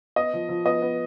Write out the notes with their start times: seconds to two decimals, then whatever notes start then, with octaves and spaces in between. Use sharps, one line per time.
0.16 B3 D#5
0.33 F3
0.49 F3
0.66 B3 D#5
0.82 B3